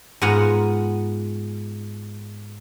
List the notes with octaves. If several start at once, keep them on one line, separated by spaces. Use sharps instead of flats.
G#2 B3 F4 F#5 G#5 A#5